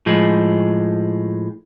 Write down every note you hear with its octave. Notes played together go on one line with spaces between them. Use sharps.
A2 F3 G#3